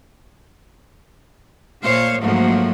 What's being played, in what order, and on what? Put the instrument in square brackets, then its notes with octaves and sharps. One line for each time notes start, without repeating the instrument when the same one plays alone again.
[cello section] A#2 A3 C5 C#5 F5
G#2 F3 F#3 A3 A#3